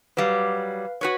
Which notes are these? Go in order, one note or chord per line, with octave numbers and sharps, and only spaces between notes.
F#3 G3 B4 F5 C7
F#4 B4 C#5